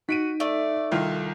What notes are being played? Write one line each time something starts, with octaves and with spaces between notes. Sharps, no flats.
D#4 F#4 B6 D7 D#7
A3 D5
C2 D#3 F4